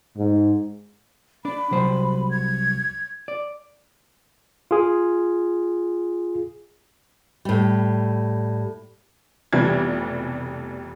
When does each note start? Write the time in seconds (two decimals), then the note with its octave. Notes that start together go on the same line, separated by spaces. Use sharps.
0.17 G#2
1.45 D4 D5 B5
1.71 C2 F#3 C5
2.31 G#6
3.28 D5
4.71 F4 G#4
7.45 A2 G3
9.53 F1 F2 B2 E3 G3 G#6